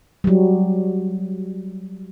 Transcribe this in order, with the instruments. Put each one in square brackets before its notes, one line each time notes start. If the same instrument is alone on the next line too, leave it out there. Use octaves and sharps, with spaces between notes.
[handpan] F#3 G3